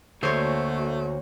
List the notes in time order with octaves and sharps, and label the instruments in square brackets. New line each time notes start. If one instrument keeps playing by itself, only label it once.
[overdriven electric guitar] D2 [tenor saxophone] A3 [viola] A#3 F#4 [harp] C5 C#5